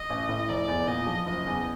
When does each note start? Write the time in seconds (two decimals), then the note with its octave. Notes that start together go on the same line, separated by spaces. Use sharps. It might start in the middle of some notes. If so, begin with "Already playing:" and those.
Already playing: D#5
0.10 A1
0.29 A2
0.49 F1 D5
0.68 E2
0.87 A#2 D#5
1.06 F3
1.26 F#1 D#5
1.46 E2